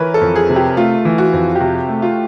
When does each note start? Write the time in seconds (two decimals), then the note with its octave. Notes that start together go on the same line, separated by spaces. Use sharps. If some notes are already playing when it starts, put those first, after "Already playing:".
Already playing: E3 A#4 B4 C#5
0.14 A4
0.21 F2
0.36 G#4
0.49 C3
0.56 G4
0.77 A3 F4
1.05 E3
1.18 F#4
1.33 F2
1.55 G4
1.60 C3 F#4
1.89 A3
2.02 F4